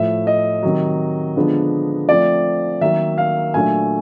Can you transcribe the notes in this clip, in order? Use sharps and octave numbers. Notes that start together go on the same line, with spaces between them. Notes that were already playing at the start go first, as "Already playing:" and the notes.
Already playing: A2 F3 A3 E5
D#5
C3 D#3 F#3
D3 F3 G#3 B3 D4
F3 A3 C4 D5
D#3 F#3 A#3 E5
F5
A#2 F#3 A3 D4 G#5